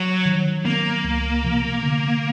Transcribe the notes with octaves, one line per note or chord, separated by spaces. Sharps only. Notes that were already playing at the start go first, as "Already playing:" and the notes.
Already playing: F#3
D#3
F#3 A#3 B3
C#2
C3 F3
D3